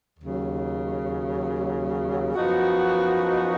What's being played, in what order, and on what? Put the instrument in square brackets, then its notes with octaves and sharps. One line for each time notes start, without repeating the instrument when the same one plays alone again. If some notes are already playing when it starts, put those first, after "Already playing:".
[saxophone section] D#2 C#3 F#3
F#2 F3 B3 D#4 F#4